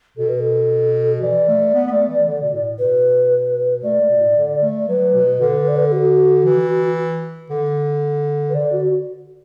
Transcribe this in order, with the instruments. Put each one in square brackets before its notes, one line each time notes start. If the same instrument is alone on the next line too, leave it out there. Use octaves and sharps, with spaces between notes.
[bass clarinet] B2 [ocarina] A4
[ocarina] B4
A4
[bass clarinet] E3 [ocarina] D5
[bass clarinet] A3
B3
B3
A3
E3
D3
B2
A2
[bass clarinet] B2 [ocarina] B4
[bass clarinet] A3 [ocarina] D5
[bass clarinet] A3
B2
A2
D3
A3
[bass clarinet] F#3 [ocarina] B4
[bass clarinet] B2
D3
[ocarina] D5
B4
A4
F#4
[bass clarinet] E3
D3
[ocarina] B4
[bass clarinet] D3 [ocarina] D5
[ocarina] F#4